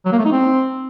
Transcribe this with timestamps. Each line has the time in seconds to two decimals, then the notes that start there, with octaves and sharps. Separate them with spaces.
0.05 F#3
0.12 A#3
0.19 A3
0.25 D#4
0.32 C4